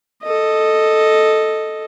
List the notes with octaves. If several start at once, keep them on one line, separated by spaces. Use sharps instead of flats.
A4 D#5